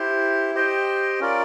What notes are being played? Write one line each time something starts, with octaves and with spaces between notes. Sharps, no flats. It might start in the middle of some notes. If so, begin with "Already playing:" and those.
Already playing: E4 G4 C5
G4 C5 D#5 G5
C#4 F4 A#4 D5